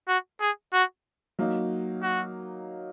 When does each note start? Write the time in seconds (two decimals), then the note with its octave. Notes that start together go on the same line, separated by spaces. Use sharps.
0.08 F#4
0.41 G#4
0.73 F#4
1.39 F#3 A#3 D#4
2.03 F#4